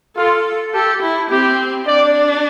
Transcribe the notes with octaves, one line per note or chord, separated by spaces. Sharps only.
F4 A4
G4 A4
E4
C4 G4
D4 D5